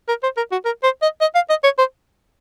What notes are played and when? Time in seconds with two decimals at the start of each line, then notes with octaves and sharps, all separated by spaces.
0.09 A#4
0.23 C5
0.37 A#4
0.52 F#4
0.65 A#4
0.83 C5
1.02 D#5
1.21 D#5
1.35 F5
1.49 D#5
1.64 C#5
1.78 C5